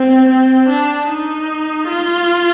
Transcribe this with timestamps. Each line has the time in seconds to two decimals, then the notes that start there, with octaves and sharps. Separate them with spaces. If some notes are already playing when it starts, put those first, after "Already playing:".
Already playing: C4
0.29 C4
0.69 D4
1.09 D#4
1.88 F4